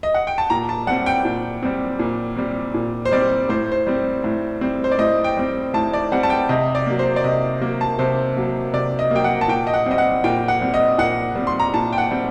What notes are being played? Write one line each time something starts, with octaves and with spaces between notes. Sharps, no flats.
D#5
F#5
G5
A5
A#2 A#5
A5
G3 C4 F#5
G5
A#2
G3 C4
A#2
G3 C4
A#2
C5
G3 C4 D5
A2 C5
C5
G3 C4
A2
G3 C4
C5
D5
A2 D#5
G5
G3 C4
A2 A5
D5
G3 C4 F#5
A5
G5
C3 D#5
D5
F#3 A#3
C5
D5
C3 D#5
F#3 A#3
A5
C3 C5
F#3 A#3
C3 D5
D#5
F#3 A#3 G5
F#5
A5
A#2 G5
D#5
F#5
G3 C4 D#5
F#5
A#2 G5
F#5
G3 C4
D#5
A#2 F#5
G3 C4
C6
A#5
A#2 A5
G5
F#5
G3 C4